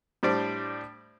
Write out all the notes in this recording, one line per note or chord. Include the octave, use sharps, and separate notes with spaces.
A2 G3 D4 C5 D5